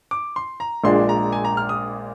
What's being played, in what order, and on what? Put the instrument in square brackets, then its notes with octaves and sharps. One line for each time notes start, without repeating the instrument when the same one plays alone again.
[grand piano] D6
C6
A#5
[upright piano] A#1 A#2 G#3 D4 [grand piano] C6
[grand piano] A#5
G#5
A#5
F6
D#6